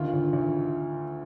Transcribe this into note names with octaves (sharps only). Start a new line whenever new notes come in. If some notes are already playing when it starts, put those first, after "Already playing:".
Already playing: D2 D#3 F4
D2
D2